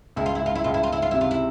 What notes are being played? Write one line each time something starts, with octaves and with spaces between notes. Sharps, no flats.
C#2 E4
F4
E4
C#2 F4
E4
C#2 F4
E4
F4
C#2 E4
F4
C3 E4
F4
E4